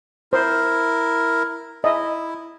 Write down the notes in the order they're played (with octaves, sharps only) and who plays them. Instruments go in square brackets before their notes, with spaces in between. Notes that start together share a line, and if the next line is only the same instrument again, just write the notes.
[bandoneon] E4 A#4 [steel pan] C5
[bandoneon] E4 [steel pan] D#5 E5